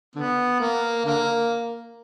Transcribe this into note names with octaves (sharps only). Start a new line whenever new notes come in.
D3 B3
A#3
D3 A#3